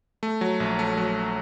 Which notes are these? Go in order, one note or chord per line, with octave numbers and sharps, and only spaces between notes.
A3
F#3
A#1
A3
F#3